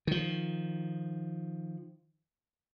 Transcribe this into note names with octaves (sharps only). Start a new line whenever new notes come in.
D#3 F3